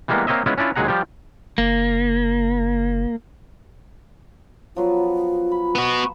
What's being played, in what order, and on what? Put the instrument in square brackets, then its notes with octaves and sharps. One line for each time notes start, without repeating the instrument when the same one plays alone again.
[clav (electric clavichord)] E3 G3 G#3 A#3 B3
A#3 C4 C#5 D#5 E5
G#3 B3 C#4 E4 F4
C#4 D4 E4 F4
D#2 F#3 G#3 G#4 F#5 A#5
F3 G3 G4
[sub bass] F#1 [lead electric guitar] A#3
[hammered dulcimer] F3 F#3 B3 [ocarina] F4
[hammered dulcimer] B5
[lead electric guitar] B3 F#4